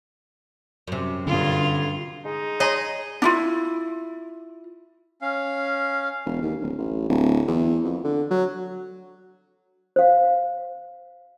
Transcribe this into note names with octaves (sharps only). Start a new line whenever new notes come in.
F#2 C3
G2 D3 F4
G#3 D#4
G#4 C#5 D#5 A#5 C6
D4 E4 F4
C#4 F5
E1
D#2
D1
A1
D1
E2
F2
D3
F#3
C5 F5